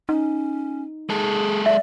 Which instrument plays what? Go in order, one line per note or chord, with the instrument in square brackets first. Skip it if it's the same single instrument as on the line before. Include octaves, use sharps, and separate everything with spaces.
[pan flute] C#4 [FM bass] D#4
[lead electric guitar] G#3 A4 [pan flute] G#4
[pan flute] D5 [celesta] E5